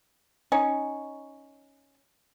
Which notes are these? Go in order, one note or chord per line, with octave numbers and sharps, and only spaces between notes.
C#4 D#4